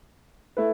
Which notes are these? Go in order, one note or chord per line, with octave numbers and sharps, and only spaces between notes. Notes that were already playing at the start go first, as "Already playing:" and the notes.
A3 E4 B4